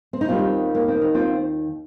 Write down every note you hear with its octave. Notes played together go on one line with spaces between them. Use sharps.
C4
D#4
D#2 D#3 G3 C4 F4
A#3
C4
D#4
C4 F4